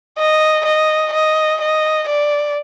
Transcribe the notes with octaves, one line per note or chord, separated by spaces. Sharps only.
D#5
D#5
D#5
D#5
D5